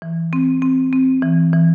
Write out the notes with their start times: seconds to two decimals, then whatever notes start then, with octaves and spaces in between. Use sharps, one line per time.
0.02 E3
0.33 C4
0.62 C4
0.93 C4
1.22 E3
1.53 E3